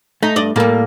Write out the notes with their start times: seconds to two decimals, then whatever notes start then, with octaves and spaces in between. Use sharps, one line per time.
0.23 A3 D#4
0.36 G2 D5 D#5
0.56 A2 G3 A#3 A4